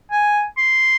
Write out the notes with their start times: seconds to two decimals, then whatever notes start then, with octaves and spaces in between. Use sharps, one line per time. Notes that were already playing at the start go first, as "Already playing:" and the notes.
0.12 G#5
0.58 C6